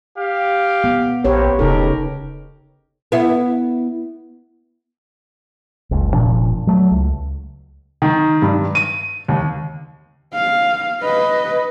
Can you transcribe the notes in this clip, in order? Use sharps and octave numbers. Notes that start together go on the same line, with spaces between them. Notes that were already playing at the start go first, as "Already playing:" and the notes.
G4 F5
B3
A#1 A#3 C4 G4 B4 C#5
E1 C#3 D#4 G4 A4 A#4
B3 E4
F#1 C#2
F1 A#2 F3 D4
F#3 A3
C#2
D#3
G2
D#7
D#2
F5
B4 D#5